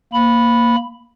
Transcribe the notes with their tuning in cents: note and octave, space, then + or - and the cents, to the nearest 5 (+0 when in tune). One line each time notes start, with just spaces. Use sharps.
A#3 +0 B5 +0